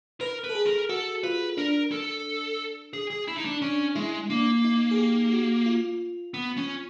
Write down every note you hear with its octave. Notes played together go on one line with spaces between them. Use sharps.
A#4 B4
B4
A4
G#4
A#4
F#4 A4
F4 B4
D4 A#4
A4
G#4
G#4
E4
D#4
D4
C#4 D4
G#3 E4
A#3 D4
D#4
G#4
G4
F#4
F4
B3
C#4